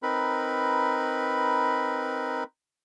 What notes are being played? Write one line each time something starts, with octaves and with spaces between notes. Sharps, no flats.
C4 D#4 A#4 B4 B5